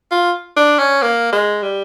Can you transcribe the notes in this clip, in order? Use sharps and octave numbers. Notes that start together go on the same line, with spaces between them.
F4
D4
C#4
A#3
G#3
G3